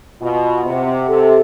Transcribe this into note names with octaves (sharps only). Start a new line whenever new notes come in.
B2 F4
C3 F#5
C3 A4